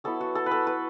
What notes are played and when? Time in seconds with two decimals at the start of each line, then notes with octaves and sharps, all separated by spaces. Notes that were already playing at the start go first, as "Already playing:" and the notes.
0.04 F#3 B3 E4 A4
0.21 F#4
0.35 A4
0.46 B4
0.51 A4
0.67 B4